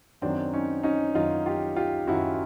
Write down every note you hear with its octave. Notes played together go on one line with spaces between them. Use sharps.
F#2 D#3 F#3 C4 D4
C#4 D#4
C#4 D#4
F#2 D#3 F#3 D#4 F4
F4 G4
F4 G4
F#2 D#3 F#3 E4 F#4